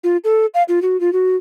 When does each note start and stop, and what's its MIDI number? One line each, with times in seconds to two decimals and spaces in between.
0.04 0.17 65
0.24 0.46 69
0.54 0.63 77
0.69 0.82 65
0.82 0.99 66
1.00 1.13 65
1.13 1.36 66